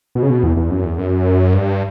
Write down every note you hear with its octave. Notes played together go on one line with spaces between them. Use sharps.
B2
C#3
B2
E2
E2
F#2
E2
F#2
G2